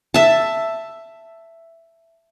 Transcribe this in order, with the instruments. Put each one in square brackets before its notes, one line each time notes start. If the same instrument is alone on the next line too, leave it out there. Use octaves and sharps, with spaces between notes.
[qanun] E5 A5